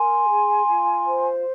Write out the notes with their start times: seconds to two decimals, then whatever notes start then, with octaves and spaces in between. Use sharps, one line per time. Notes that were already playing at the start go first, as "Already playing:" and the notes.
Already playing: A#4 G#5 C6
0.28 G#4
0.66 F4
1.04 C5